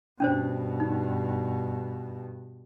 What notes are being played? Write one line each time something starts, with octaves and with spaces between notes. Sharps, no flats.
G2 B2 C#4 D4 C5
D#4